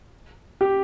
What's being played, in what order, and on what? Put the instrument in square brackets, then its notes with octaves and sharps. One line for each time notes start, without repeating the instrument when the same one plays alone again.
[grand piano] G4